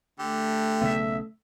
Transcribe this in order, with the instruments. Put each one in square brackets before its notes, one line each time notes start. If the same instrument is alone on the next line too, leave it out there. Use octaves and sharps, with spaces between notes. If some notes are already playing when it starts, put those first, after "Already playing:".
[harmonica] D3 G4 [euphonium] A3
[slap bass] B1 C#3 B3 [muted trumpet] E5